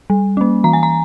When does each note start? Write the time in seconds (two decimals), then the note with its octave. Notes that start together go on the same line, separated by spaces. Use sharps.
0.10 G3
0.37 A#3 C#4
0.64 E3 A#5
0.73 G#5
0.83 A#5